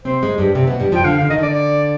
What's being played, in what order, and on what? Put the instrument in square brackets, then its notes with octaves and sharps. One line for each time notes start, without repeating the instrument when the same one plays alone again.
[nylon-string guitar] C3 C4 [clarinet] C5
[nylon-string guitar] G#2 G#3
G2 G3
C3 C4
B2 B3
G2 G3
[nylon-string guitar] F2 F3 [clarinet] G5
[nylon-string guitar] D3 [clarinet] F5
[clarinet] F5
[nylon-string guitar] D3
[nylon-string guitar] D#3 [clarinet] D#5
[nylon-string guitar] D3 [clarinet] D5
[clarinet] D5